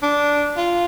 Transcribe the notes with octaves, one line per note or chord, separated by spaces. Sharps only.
D4
F4